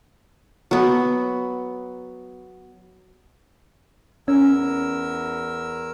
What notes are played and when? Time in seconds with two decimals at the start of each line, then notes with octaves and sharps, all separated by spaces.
0.71 F#3 B3
4.28 E2 C#4 A#4 E6